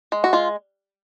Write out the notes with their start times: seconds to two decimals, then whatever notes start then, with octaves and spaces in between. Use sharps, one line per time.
0.12 G#3
0.24 F#4
0.33 G#3 F4